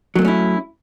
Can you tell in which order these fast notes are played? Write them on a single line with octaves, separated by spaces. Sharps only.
F#3 A#3 A3 C#4 E4